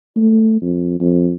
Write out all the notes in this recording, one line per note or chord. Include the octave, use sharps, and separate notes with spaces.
A3
F2
F2